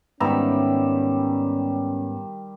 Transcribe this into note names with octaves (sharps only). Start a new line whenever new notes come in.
G#2 D#3 G3 B3 C#4 E5 A#5